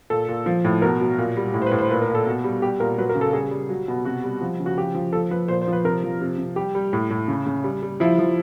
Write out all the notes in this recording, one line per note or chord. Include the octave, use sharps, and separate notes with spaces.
A#2 A4
A#2
F3
A2
B2 A#4
F#3
A#2
G3
A2
C5
B4
A2
C5
A#2 B4
A#4
A#2
A4
B2
G3
G3 G4
A#2 A#4
F#3 B4
A#4
C#3
A4
G3 G#4
G3
F#3
B2
C3 F#4
G3
F3
C#3
F#4
F3 G4
F3
F3 A4
F3 B4
A#2 C5
C5
F3 B4
C3 A#4
F3
C3
C3
G3 G4
G3
A2
A2
C#3
C#3
G3
G3
F3 E4
F3